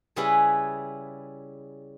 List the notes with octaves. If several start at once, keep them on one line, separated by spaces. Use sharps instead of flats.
C#3 G3 E4 G4 G#4 B4